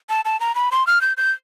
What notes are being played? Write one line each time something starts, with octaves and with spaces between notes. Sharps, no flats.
A5
A5
A#5
B5
C6
F6
G6
G6